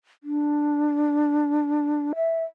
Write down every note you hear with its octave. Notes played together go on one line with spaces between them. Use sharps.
D4
E5